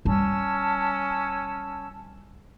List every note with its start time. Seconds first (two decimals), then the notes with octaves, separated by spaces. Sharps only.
0.05 G3 C#4 A5 E6